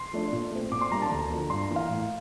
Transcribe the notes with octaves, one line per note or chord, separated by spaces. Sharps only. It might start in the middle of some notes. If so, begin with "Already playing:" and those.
Already playing: C6
F3 A3 D4
A#2
A3 C4
A#2 D6
C6
G3 A#3 D4 A#5
A5
D2 A#5
D3 F3 A#3
G2 C6
A#5
E3 A#3
F5
A2